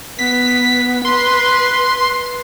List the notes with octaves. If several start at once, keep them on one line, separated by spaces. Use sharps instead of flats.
B3 B6
B4 C6